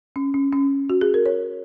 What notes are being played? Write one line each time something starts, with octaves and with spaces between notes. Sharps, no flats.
C#4
C#4
C#4
F#4
G#4
A#4
C#5